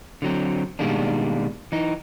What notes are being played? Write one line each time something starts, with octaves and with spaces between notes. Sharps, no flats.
D3 F#3 C4
B2 D#3 G3 G#3 A#3 D4
E3 D#4